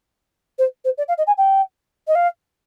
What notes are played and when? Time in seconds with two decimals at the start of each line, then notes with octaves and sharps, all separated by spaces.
0.58 C5
0.84 C5
0.97 D5
1.08 F5
1.18 D#5
1.27 G#5
1.37 G5
2.07 D#5
2.15 F5